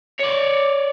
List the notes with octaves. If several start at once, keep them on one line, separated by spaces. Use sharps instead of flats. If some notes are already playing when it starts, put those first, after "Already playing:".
C#5 D5